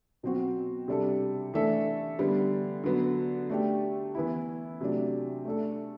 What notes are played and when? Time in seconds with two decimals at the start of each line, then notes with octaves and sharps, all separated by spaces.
0.23 B2 F#3 C4 F#4
0.88 C3 G3 D4 A4
1.53 E3 A3 D4 A4 E5
2.19 D3 G3 B3
2.84 D3 F#3 B3
3.50 A3 D4 G4
4.15 E3 B3 E4
4.81 C3 F#3 A3 D4
5.45 A3 D4 A4